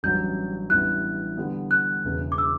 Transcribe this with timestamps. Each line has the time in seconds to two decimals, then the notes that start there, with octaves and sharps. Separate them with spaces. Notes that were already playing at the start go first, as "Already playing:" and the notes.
0.03 A1 G2 F#3 C#4 G6
0.70 A1 G2 E3 B3 E4 F#6
1.37 D3 G3 B3
1.71 F#6
2.04 E1 E2 C#3
2.32 D6
2.38 E6